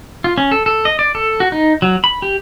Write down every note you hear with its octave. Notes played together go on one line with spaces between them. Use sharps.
F4
C#4
A4
A4
D#5
D5
A4
F#4
D#4
F#3
B5
G4